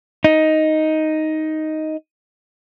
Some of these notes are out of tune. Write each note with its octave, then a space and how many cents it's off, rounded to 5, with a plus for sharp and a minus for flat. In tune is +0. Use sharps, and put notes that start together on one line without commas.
D#4 +5